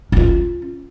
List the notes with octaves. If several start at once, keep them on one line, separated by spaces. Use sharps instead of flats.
C#4 F4